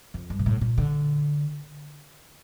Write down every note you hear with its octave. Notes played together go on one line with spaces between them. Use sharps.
F2
G2
A#2
A2
A#2
D3